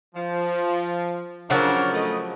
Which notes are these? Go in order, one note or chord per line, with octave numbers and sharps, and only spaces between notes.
F3
C#3 F3 F#3 D4 A#4 C#5
A3 D#5